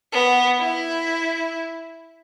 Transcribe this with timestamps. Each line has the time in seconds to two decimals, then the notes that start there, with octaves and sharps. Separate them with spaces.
0.12 B3
0.60 E4